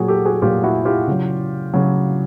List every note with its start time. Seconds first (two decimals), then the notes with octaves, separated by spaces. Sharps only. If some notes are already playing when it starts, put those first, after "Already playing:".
Already playing: A#2 F#3 F#4 G#4
0.08 G4 A4
0.25 F#4 G#4
0.42 A#2 F4 G4
0.45 F#3
0.64 E4 F#4
0.85 F4 G4
1.07 C#3 F#3
1.74 C#3 F#3